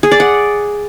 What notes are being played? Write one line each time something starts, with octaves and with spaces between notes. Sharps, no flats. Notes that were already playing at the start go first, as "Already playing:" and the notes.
G#4
D5
F#5